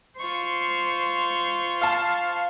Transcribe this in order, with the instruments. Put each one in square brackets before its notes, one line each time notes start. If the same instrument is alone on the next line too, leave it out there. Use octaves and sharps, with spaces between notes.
[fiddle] F4 C#6 [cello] C5
[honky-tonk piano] F5 A5